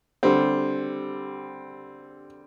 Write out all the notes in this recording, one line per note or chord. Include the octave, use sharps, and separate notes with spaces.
D3 G3 C4